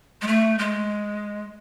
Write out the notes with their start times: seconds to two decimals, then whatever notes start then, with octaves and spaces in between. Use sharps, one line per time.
0.22 G#3
0.27 A3
0.59 G#3